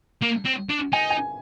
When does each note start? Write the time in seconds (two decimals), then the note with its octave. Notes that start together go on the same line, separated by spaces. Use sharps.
0.22 A#3
0.45 C4
0.69 D4
0.92 D#4 G#5
1.10 G#5